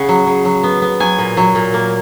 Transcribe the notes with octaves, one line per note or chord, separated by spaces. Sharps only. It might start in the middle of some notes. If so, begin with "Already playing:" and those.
Already playing: C#3 F#5
F#3
C#3
F#3
B3
B3
F#3 G#5
A#2
F#3
A#2
A#3